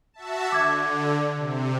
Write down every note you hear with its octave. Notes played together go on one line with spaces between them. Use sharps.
F#4 E5 A5
D3 D6 G#6
C3